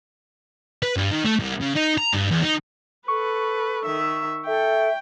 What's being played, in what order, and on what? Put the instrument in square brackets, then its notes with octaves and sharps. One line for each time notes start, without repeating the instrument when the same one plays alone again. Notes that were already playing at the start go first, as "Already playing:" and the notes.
[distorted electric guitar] B4
G2
D#3
A3
C2
C#3
D#4
A#5
G2
E2
D#4
[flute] A4 [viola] B4 [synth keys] C#6
[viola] D#3 E5
[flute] A4 [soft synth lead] E5 [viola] G5